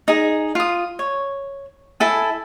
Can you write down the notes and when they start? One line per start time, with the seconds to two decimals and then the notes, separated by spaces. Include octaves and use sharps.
0.08 D#4 G#4
0.55 F4 D#6
0.99 C#5
2.00 E4 A4 G#5